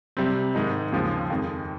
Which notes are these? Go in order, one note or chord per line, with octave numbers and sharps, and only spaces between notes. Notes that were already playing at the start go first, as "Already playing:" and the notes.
C3 G3 C4
G#2 D#3 G#3 D#4
D#2 C#3 F3 G#3
F2 D#3 G#3